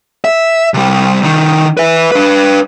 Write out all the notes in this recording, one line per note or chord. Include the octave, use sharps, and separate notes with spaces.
E5
C3 G3
C2 D#3
B4 E5
D4 B4